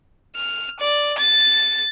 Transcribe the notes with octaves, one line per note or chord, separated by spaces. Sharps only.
F6
D5
A6